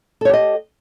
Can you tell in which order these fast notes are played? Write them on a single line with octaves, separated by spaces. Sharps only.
A4 C#5 G4 D#5